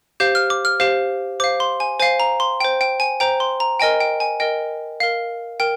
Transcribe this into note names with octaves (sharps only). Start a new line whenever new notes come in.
G4 C5 F5 G6
F6
D6
F6
G4 C5 F5
C5 F5 D6
C6
G#5
C5 F5 G#5
A#5
C6
C5 G5
G5
G#5
C5 G5 A#5
C6
A#5
A#4 D#5 G5 G#5
G5
G#5
A#4 D#5 G5
A#4 F5
A#4 G5